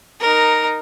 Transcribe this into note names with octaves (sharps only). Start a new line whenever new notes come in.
D#4 A#4